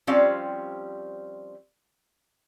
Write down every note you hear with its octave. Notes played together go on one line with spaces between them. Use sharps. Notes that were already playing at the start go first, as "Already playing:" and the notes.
F3 G3 C4 C#4 D5 F5